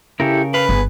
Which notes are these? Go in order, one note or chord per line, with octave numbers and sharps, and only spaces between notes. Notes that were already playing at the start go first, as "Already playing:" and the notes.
C#3 E4 G4 A4 A#4
B4 F5 B5
G1 B3 G#4